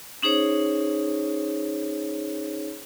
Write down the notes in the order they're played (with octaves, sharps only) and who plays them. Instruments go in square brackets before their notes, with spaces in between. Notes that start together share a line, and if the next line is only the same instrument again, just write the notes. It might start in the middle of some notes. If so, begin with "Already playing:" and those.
[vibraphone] C#4 D#4 G#4 C5 C#5